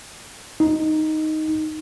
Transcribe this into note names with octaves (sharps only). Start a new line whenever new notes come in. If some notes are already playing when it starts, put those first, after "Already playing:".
D#4